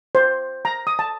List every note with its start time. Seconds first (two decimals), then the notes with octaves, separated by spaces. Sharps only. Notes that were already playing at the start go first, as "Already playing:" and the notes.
0.15 C5
0.65 A#5
0.87 D#6
0.99 A5